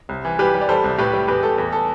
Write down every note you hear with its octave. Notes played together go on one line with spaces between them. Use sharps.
C2
E3
G3 G4 B4
G3
D5
G3 A4 C5
C2
A2 G4 B4
G3
E2 G4 B4
A3 A4
E2
A4